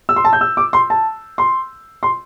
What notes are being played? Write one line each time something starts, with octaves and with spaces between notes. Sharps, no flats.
E6
C6
A5
G6
E6
D6
C6
A5
C6
C6